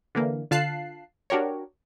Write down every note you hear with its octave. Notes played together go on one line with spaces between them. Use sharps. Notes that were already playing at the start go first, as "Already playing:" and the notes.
D3 E3 A#3
D3 F4 F5 A5 F#6 C7
D4 F#4 G4 A#4 C#5